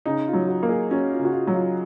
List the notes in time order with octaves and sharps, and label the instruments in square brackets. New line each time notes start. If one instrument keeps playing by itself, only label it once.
[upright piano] C#3 [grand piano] D#4
[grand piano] F4
[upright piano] F#3
[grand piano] F#4
[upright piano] A#3
[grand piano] G#4
[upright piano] C#4 [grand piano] F#4
[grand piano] F4
[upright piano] C#3
[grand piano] F#4
F4
[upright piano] F#3
[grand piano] F4